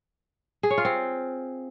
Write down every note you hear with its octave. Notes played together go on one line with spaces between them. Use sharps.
G#4
C#5
F4
C4